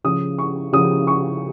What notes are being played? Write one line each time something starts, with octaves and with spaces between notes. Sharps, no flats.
C#3 F3 D#6
C#6
C#3 F3 D#6
C#6